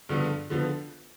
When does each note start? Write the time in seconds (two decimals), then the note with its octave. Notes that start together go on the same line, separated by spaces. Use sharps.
0.09 G2 D3 F3 B3
0.50 D3 F3 B3